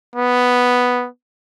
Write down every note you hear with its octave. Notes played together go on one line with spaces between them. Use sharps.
B3